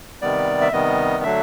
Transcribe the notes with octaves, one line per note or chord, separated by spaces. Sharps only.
C3 D#3 G3 B3 D5
E5
C3 D#3 G3 B3 D#5
D3 F#3 A3 D4 E5